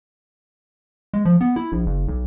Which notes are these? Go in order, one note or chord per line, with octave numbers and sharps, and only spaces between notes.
G#3
F3
B3
E4
A#1
F#1
B1